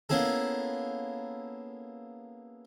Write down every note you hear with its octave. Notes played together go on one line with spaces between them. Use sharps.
A#3 B3 C#4 E4 G#4 A4